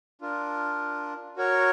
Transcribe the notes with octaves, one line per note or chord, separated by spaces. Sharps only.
D4 F4 A#4
F#4 A#4 C#5